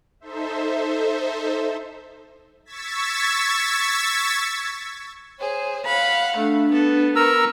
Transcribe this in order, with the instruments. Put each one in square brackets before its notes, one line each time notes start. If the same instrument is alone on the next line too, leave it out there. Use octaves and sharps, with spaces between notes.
[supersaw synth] D#4 A4 C5 E5
C#6 E6 G#6 A6 B6
[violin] G#4 C5 [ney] C#5
[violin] F5 F#5 [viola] B5
[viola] A3 [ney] D4
[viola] B3 [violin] A4
[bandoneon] A#4 A#5 E6 [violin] B4 C#6